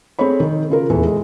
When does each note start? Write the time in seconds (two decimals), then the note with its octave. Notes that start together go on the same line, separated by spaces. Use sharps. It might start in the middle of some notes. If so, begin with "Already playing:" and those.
0.19 C4 G#4 A4 C#5 B5
0.40 D#3
0.70 C#3 F4 A#4
0.90 D#1 E2 E3 A4
1.05 G#3